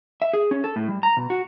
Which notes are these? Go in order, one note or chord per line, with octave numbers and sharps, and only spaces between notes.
E5
G#4
C#4
A4
A2
G3
A#5
B2
F#4